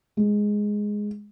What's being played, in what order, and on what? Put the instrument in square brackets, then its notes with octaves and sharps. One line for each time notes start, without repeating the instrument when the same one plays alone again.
[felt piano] G#3